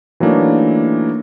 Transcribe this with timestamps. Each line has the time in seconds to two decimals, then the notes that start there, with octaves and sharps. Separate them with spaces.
0.20 E3 F#3 A3 A#3 D4 D#4